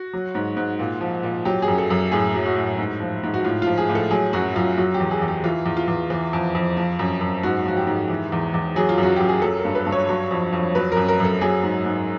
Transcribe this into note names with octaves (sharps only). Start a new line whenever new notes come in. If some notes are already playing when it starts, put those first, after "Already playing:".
Already playing: F#4
F#3
G#2
G#2
A#2
F3
A#2
F#3 G4
G#4
F#2
A4
F#2
A2 G#4
F#3
F#4
A2
G#2
F3
G#2
F#4
A2 F4
F3 F4
G#4
A2
A4
F#3 G#4
F#2 F#4
F#2 F4
F#3 F#4
G4
E2
G#4
E2
G4
E3 F4
E2
F4
E2
E3
F2
F2
F3
F#2
F#2
G#2 F#4
F3 F#4
G4
G#2
E3
E2
E2
F#3 G#4
F4
F#2
F#4
F#2 G4
G#4
F#3 A4
A#4
G2
B4
G2
C#5
F#3
F2
F2
F#3 B4
F#2 A#4
A#4
F#2 A4
F#3 G#4
G#2
G#2